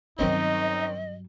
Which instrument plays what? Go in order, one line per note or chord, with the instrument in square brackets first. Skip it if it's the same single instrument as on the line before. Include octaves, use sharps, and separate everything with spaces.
[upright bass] G2 F#3 [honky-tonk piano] D#3 C4 C#4 [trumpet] D#4 [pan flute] D#5